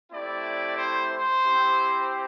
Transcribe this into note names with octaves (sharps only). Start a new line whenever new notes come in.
A3 C4 E4 G4 D5
C5
C5
C4 E4 G4